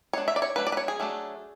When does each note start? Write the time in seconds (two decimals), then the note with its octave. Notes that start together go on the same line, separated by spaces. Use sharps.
0.13 G#3 B3 D4 C#5
0.28 E5
0.36 D5
0.42 C#5
0.56 F#3 A3 D4 B4
0.67 D5
0.72 B4
0.77 C#5
0.88 G#4
1.00 F#3 A3 D4